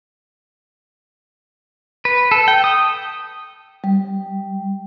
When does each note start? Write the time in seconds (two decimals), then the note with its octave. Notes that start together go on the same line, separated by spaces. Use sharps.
2.05 B4
2.31 A4
2.48 G5
2.64 D#6
3.84 G3